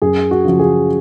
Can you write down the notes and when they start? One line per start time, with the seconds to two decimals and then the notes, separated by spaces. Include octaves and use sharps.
0.02 F#2 G#4
0.31 F#4
0.44 C#3 F3 F#4
0.59 G#4